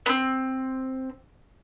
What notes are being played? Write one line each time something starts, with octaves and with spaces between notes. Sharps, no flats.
B3 C4